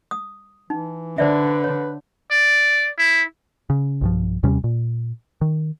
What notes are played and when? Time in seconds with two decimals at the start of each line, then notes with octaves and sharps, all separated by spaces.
0.11 D#6
0.70 E3 D#4
1.18 D3 B4 C5 D5 E5
1.64 C#5
2.31 D5
2.98 E4
3.70 C#3
4.01 B1 G2 F3
4.43 D#2 C3 G3 C#4
4.64 A#2
5.41 D#3